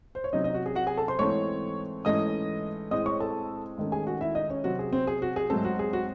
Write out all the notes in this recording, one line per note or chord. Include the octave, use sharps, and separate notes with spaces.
C5
C#5
C3 F#3 C#4 D#4 D#5
D#4 D#5
F#4
G#4
F#4 F#5
G#4 G#5
A4 A5
C5 C6
G#2 E3 A3 C4 C#5 C#6
G#2 E3 A3 C#4 D#5 D#6
A2 G#3 C4 D#5 D#6
C#5 C#6
A4 A5
G#2 D#3 A3 C#4
G#4 G#5
F#4 F#5
E4 E5
D#4 D#5
C#4 C#5
C3 F#3 C4 F#4
G#4
C4 C5
G#4
F#4
G#4
G#2 F#3 A3 C4 A4
F#4
G#4
F#4